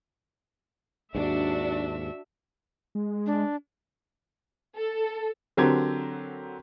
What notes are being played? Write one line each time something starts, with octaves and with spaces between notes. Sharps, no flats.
D#2 G#2 D4 F#4 E5
G#3
D4
A4
D3 F#3 C4 G4 A#4 G#6